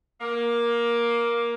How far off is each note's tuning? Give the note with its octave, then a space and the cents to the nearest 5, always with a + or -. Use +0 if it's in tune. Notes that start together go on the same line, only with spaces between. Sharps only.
A#3 +15